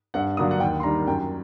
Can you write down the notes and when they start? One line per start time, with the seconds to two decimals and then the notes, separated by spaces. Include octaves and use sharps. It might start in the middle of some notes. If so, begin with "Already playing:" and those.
0.14 G2 F#5
0.37 D3 F#3 A#3 D4 D#6
0.51 F#5
0.60 D#2 G5
0.80 C6
0.83 D#3 G3 D4 A#5
1.07 F#2 G5